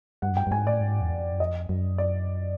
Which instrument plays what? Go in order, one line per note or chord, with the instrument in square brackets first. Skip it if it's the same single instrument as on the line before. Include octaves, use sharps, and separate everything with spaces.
[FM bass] G2 [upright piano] F#5
[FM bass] F#2
[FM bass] G2 [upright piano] G5
[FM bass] G2
[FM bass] G#2 [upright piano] G#5
[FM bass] A2 [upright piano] D5
[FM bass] G#2
E2
F2
F#2
[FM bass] F2 [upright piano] D#5
[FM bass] F#2
[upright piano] D5